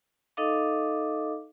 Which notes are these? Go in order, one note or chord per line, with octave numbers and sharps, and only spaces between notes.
D#4 A4 D#5 F5 D6